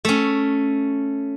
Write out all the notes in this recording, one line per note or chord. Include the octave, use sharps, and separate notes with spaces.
A3 C#4